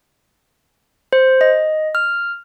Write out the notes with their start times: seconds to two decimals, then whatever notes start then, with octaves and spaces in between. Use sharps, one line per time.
1.13 C5
1.41 D#5
1.95 F6